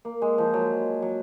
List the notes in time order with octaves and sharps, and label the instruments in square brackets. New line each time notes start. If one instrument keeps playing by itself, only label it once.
[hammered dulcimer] A#3
G#3
F3
F#3
F#3